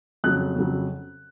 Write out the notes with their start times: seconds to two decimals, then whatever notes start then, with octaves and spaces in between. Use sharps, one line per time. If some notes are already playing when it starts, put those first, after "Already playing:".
0.24 F2 C#3 F#3 F#6
0.56 F2 C#3 F#3